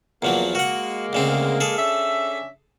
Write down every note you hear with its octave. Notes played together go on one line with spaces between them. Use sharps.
E2 F3 F#3 A#3
G#3 A#3 F#4 F#5
D2 C#3 C4
G#4 A4
C#4 D4 E5